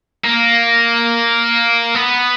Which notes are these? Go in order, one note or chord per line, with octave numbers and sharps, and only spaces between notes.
A#3
B3